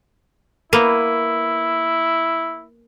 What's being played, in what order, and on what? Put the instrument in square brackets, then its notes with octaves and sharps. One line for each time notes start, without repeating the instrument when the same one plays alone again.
[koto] A#3 B3 [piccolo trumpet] E4